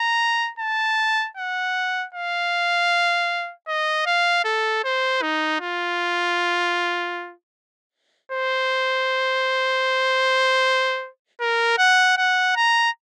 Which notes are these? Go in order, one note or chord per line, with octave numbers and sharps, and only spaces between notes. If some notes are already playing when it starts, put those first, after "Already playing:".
Already playing: A#5
A5
F#5
F5
D#5
F5
A4
C5
D#4
F4
C5
A#4
F#5
F#5
A#5